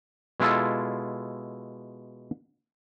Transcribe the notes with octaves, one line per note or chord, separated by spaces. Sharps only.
B2 G#3 E4 F4 A4